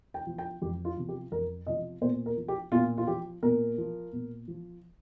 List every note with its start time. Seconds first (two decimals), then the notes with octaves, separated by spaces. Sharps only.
0.14 G5
0.27 F3
0.38 G5
0.62 F2 G4
0.85 F4
0.97 C3 F3
1.09 G4
1.31 F2 A#4
1.66 C3 F3 D#5
2.01 A#2 C5
2.26 A#4
2.37 F3
2.48 G4
2.72 A#2 F4
2.98 F4
3.07 F3 G4
3.43 A#2 A#4
3.78 F3
4.13 A#2
4.48 F3